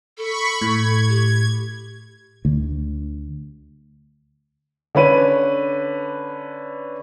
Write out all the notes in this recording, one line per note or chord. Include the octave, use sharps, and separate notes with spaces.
A4 B5 C#6
A2 G#6
G4
D2
D3 C#4 B4 D#7